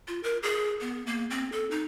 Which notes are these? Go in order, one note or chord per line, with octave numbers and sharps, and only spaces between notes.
F4
A#4
G#4
B3
A#3
C4
A4
D#4